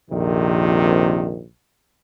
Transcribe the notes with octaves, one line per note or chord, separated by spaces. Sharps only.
A#1 F2 C3 D#3